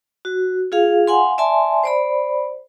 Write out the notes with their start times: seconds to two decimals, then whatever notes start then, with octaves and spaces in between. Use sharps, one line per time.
0.25 F#4
0.72 F4 G#4 F5
1.08 F5 F#5 G#5 C6
1.38 D5 E5 G#5 A5 C6
1.83 C5 D5 B5